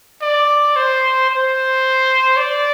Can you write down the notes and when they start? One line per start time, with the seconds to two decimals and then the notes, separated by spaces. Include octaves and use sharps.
0.22 D5
0.76 C5
1.29 C5
2.37 D5